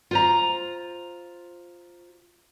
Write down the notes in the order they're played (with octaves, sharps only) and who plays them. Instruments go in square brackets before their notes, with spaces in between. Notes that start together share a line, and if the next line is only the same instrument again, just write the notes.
[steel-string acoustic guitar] F4 C5 A#5